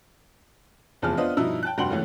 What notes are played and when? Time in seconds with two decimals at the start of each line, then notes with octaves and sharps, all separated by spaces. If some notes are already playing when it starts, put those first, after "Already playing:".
1.02 F1 E2 F3 G#4 A5 F6
1.17 B3 D4 F4 B4 C5 D#5
1.37 G2 B2 F3 D#4 E4 E6
1.63 G5 A5 F#6
1.78 F1 G2 F#4 G5 C6 F#7
1.90 C#2 E3 A3 C#4